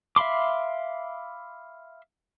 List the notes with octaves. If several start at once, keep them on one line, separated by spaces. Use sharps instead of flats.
E5 F5 B5 C6 D6